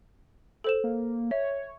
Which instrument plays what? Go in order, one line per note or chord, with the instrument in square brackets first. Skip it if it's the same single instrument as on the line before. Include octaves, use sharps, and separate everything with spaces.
[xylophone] A4 C5 E7
[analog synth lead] A#3
[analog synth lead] C#5 [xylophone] E5